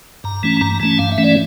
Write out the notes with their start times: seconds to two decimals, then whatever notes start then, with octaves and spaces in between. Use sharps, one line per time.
0.24 G2 A#5
0.43 E3 A3 C#4
0.61 G2 A#5
0.80 E3 A3 C#4 A5
0.99 G2 F5
1.12 E5
1.18 E3 A3 C#4
1.24 D5